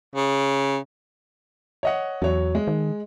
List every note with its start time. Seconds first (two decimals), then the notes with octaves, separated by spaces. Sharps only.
0.15 C#3
1.83 C#5 D#5 F#5
2.22 E2 F#3 C#5
2.55 G#3
2.67 D#3